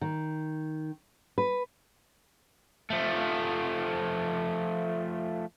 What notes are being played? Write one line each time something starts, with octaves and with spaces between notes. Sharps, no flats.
D#3
B4
F3 A3